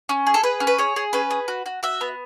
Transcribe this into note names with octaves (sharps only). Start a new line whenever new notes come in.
C#4
G#4
A4
G#4 B4
C#4
B4
G#4 C#5
G#4
C#4 B4
G#4
F#4
F#4
F#4 E5
B3